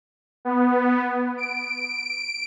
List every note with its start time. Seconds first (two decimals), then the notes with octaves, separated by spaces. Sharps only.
0.45 B3
1.38 D7